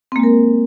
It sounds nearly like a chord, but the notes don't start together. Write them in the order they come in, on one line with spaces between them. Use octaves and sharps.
C4 A#3 G#3 A#4